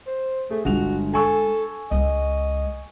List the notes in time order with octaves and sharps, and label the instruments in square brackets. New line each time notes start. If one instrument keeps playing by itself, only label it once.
[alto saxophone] C5
[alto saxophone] A3 [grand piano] G#4
[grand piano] G1 F7 [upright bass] G#3 F4 [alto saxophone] F#4
[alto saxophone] A4 [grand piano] G#5 C#6 E6
[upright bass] C#2 G#3 [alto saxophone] D#5